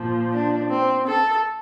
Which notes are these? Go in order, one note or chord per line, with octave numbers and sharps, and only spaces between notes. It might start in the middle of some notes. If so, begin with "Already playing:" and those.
Already playing: A#2 F3
D4
C4
A4